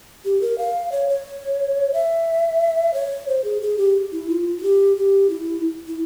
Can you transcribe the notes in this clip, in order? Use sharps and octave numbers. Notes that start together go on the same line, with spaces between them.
G4
A#4
F5
C#5
C#5
E5
C#5
C5
G#4
G#4
G4
E4
F4
F4
G4
G4
E4
E4